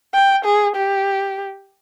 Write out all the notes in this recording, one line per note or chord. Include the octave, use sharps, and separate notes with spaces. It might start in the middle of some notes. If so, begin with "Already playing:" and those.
G5
G#4
G4